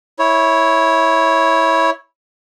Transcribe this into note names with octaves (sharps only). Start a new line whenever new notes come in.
E4 C#5